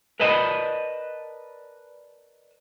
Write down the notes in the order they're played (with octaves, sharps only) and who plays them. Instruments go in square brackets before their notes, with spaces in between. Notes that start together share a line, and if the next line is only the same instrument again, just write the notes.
[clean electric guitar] A#4 B4 D5 D#5 A5 B5